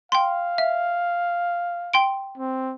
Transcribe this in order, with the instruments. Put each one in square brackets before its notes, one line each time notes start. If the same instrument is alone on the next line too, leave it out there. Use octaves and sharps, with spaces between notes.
[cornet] F5 [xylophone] G5 C6
[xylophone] E5
G5 C6 D7
[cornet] C4